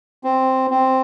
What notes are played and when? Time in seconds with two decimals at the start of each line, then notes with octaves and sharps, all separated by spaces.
0.24 C4
0.71 C4